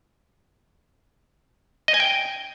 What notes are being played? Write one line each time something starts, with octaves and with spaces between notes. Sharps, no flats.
D#5
G#5
G5